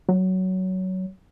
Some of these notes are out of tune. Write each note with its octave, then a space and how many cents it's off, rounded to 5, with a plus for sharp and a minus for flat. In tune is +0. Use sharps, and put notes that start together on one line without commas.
F#3 +15